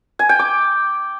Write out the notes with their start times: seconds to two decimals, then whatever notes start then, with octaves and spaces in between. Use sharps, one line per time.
0.19 G#5
0.29 G5
0.39 D6